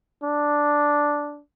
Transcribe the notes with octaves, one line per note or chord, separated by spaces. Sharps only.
D4